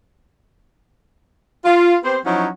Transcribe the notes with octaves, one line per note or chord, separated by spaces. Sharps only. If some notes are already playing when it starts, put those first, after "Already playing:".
F4
B3 C4 G4 C5
F3 F#3 C#4 D#4 E4 F#4